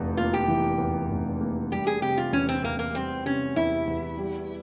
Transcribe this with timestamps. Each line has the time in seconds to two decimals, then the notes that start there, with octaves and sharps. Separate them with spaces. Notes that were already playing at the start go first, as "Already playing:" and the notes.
Already playing: F1 E2
0.17 A#3 F4
0.33 G4
0.48 E3
0.78 E2
1.10 F1
1.41 A#3
1.72 G3 G4
1.87 G#4
2.02 C3 G4
2.18 F4
2.32 E2 C#4
2.49 C4
2.63 E2 A#3
2.79 A#3
2.94 G3 C4
3.26 C3 C#4
3.56 E2 E4
3.87 E2
4.18 G3